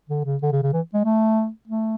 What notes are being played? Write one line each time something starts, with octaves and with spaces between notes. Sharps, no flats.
D3
C#3
D3
C#3
C#3
E3
G#3
A3
A3